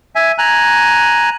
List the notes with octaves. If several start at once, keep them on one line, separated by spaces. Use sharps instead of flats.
E5 G#5
G#5 A#5 F#6